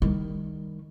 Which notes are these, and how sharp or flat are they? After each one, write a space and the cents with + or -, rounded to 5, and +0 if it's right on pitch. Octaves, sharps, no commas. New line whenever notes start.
D#3 +0 G3 +15